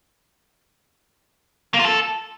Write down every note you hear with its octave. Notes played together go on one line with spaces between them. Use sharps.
A#3
F4
A4